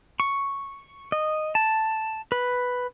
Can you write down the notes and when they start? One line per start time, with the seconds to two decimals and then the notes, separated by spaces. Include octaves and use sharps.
0.20 C#6
1.12 D#5
1.55 A5
2.32 B4